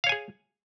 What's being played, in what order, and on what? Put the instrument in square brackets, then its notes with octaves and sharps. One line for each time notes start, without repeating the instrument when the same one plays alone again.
[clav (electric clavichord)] F5
C#5
G#5
G#4